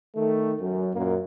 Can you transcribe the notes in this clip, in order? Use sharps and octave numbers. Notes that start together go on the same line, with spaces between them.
D#3 A3
F#2
F#2 A#2 A#3